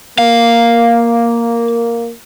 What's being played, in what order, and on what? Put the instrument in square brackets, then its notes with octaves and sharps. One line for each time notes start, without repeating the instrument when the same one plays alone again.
[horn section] A#3 [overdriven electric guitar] F5